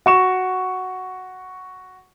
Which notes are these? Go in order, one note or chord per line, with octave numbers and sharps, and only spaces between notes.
F#4 C#6 E7